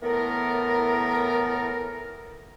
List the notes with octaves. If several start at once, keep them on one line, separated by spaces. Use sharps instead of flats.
A2 E3 B3 A4 A#4